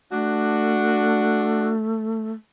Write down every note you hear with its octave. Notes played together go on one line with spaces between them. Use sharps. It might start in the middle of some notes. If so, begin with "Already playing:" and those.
A3 D4 F#4